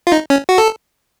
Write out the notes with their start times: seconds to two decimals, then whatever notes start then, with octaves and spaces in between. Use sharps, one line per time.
0.07 F4
0.12 D#4
0.30 C#4
0.49 F#4
0.58 A4